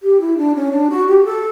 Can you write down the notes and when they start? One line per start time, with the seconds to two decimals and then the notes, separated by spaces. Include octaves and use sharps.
0.03 G4
0.20 E4
0.38 D4
0.55 C#4
0.72 D4
0.90 F#4
1.08 G4
1.25 A4